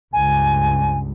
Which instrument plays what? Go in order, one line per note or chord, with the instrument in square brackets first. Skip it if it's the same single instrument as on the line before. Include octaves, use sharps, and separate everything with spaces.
[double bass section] C#2 G2 [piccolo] G#5